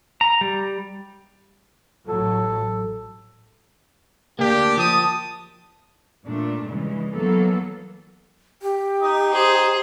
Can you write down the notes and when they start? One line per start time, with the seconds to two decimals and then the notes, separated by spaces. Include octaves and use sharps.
0.21 A#5
0.41 G3
2.08 A1 A2 F#3 A4
4.39 D2 A#3 D4 G4
4.77 F3 A5 D#6
6.26 A#2 A3 D4
6.67 G2 C#3 E3 G#3
7.13 E3 F#3 A#3 B3 A4
8.62 G4
9.02 D#4
9.32 G#4 C5